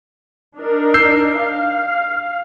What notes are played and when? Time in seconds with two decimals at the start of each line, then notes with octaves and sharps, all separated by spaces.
0.57 D4 D#4 A#4
0.94 E6 G6 C7
1.40 F5